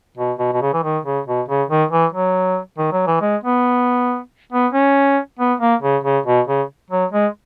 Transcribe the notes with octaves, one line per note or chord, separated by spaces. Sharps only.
B2
B2
B2
C#3
E3
D#3
C#3
B2
C#3
D#3
E3
F#3
D#3
F#3
E3
G#3
B3
B3
C#4
B3
A#3
C#3
C#3
B2
C#3
F#3
G#3